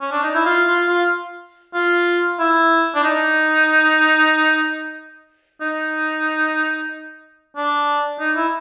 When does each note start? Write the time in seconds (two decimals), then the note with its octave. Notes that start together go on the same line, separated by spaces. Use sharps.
0.01 C#4
0.12 D4
0.23 D#4
0.35 E4
0.46 F4
0.67 F4
0.89 F4
1.74 F4
2.40 E4
2.95 D4
3.04 D#4
5.61 D#4
7.56 D4
8.20 D#4
8.36 E4